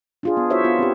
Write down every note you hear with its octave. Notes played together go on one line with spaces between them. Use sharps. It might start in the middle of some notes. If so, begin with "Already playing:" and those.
D4 F4 G#4
B3
E4 F#4 C5 C#5 E5
B3 F4
C4 G4